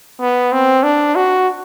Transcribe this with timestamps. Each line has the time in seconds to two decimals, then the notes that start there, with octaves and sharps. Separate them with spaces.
0.21 B3
0.52 C4
0.83 D4
1.15 F#4